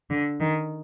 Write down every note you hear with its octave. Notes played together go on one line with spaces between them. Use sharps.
D3
D#3